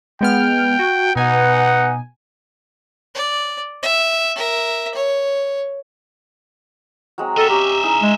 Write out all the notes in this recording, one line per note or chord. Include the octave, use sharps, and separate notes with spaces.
G#3 B3 G5 F6
F#4
B2 B3 D#4 B4 F#5 G#5
D5
E5
A#4 E5
C#5
F#3 G#3 C4
A4 A#4 C5 D#5 E5 G5
C#4 G4 A#5 D6
G#5
D#4 E4 G#4
G#3